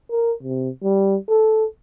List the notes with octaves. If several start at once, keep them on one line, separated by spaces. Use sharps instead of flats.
A#4
C3
G3
A4